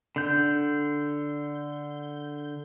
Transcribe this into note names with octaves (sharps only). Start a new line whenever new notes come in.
D3 G6